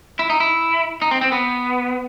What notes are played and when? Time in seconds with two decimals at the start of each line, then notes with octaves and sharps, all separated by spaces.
0.19 E4
0.30 D#4
0.40 E4
1.02 D#4
1.11 C4
1.21 C4
1.32 B3